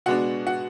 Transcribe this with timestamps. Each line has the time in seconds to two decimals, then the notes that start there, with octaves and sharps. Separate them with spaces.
0.06 B2 G#3 B3 D4 F#4 F#5
0.47 F#4 F#5